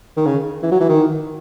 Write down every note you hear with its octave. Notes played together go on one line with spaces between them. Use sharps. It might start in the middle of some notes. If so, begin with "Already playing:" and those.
D#3
C#3
E3
F#3
E3
D#3